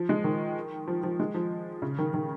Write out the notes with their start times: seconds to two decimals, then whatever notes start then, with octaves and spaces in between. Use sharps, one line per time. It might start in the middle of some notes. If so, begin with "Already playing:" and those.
Already playing: F3
0.09 G#3
0.24 D#3
0.88 F3
1.03 F3
1.20 G#3
1.34 F3
1.82 C#3
1.99 D#3
2.14 D#3